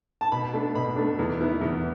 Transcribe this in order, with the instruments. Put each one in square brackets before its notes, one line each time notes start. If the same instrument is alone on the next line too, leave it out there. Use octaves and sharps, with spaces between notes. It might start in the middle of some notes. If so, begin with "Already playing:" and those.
[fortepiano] A5
B2 B5
A3 D4
B2 B5
A3 D4
E2
E3 B3 E4
E2